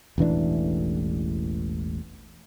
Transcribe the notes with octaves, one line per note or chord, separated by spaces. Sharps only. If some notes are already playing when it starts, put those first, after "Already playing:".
E1 A1 E3 D4